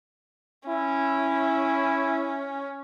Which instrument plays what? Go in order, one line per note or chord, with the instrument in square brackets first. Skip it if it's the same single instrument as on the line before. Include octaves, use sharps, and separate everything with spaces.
[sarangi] C#4 [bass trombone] E4